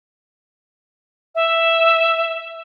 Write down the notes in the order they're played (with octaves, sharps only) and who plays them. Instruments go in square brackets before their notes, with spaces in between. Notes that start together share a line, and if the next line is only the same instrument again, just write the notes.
[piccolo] E5